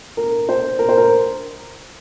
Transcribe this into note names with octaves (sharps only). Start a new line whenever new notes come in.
A#4
C5
A#4
C5
A#4